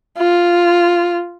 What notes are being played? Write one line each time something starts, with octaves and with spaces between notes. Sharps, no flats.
F4